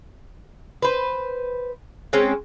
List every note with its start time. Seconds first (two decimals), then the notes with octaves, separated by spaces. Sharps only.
0.82 B4 C5
2.13 G#3 C4 C#4